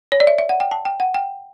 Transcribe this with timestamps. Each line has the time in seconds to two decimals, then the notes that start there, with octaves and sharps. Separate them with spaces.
0.12 C#5
0.20 D5
0.27 E5
0.38 E5
0.49 F#5
0.60 G5
0.71 A5
0.85 G5
1.00 F#5
1.14 G5